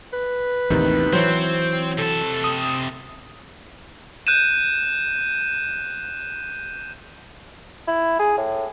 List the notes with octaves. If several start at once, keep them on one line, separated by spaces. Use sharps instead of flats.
B4
A1 D#2 C3 D#3 D#4
E3 F#3 C4 C5 C#5
C3 A4 A5
D#6
F#6 G6 D#7 E7
E4
G#4
A2